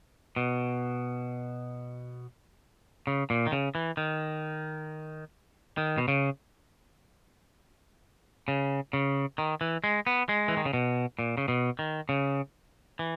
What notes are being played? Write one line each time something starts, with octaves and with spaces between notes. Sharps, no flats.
B2
C#3
A#2
D#3
C#3
E3
D#3
D#3
B2
C#3
C#3
C#3
D#3
E3
G#3
B3
G#3
E3
D#3
C#3
B2
A#2
C#3
B2
D#3
C#3
E3